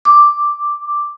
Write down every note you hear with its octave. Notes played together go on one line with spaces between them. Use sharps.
D6